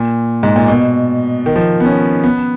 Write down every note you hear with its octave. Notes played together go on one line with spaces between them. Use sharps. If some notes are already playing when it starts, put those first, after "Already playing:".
Already playing: A#2
G#2
A#2
B2
D#3
F3
B3
C#4
B3